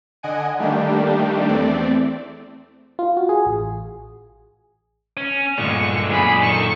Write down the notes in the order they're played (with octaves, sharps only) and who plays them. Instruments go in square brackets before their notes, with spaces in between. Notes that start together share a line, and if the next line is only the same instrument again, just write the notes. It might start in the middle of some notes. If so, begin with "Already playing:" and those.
[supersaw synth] D3 D#5 F#5 G#5 D7
D#3 G3 A3 A#3 D4 G4
E2 A3 C4 D5
[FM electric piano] F4
F#4
G#4
A1
[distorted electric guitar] C#4
[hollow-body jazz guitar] D2 G2 A#2 [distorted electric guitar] D3 G#3 [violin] C#6
[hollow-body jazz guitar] F#2 A#2 [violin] G#4 B5
[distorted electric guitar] D#3 [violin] A4 C#6